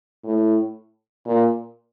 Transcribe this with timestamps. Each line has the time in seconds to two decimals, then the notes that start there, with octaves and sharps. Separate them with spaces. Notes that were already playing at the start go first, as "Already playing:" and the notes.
0.24 A2
1.26 A#2